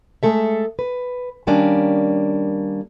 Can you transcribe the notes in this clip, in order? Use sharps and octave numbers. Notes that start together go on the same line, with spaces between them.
G#3 A3 A4 E5
B4
D#3 G3 A#3 C#4 D4